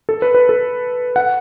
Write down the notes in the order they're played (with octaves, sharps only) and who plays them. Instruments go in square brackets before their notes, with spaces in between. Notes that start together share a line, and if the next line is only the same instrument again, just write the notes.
[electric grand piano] A4
B4
B4
A4
F#5